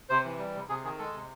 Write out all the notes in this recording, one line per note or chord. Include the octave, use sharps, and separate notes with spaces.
C3 C5
E3
G3
C3
C3 G#4
D#3 G#4
G#3 A4
C3